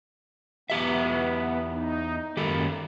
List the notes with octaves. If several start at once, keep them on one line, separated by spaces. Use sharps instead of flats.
E2 B3 G4 E5
D#4
F#2 D#3 A#3 G4 A4